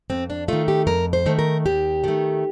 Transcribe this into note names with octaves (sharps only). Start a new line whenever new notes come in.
F2 C4
D4
D#3 A3 F4
G4
F2 A#4
C5
D#3 A3
A#4
D#2 G4
D#3 A3